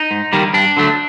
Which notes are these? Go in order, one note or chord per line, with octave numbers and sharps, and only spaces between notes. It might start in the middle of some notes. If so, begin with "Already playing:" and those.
Already playing: D#4
G#2
D#3 G3 A#3
G2 D4
D3 F#3 A3